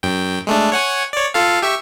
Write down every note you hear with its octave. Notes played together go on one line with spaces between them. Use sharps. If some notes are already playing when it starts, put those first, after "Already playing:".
F#2 G5
G#3 A3 D4
C#5 F#5 G#5
C#5 D5
F4 A4 F5
G4 E5 C#6